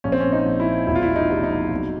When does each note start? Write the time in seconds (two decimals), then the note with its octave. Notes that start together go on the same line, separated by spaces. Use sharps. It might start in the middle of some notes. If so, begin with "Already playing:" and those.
0.04 A#1 C#4
0.12 C4
0.20 C#4
0.32 D#4
0.46 A#1
0.60 E4
0.87 E1 E4
0.95 F4
1.02 E4
1.16 D#4
1.30 C3
1.44 D#4
1.72 B1